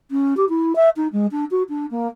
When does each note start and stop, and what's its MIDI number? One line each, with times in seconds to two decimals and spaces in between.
0.11 0.36 61
0.37 0.45 67
0.49 0.76 64
0.76 0.89 76
0.97 1.08 63
1.13 1.27 56
1.32 1.45 62
1.51 1.63 66
1.69 1.86 62
1.91 2.08 58